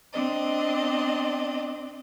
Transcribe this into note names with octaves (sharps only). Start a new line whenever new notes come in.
C4 D4 D5 D#5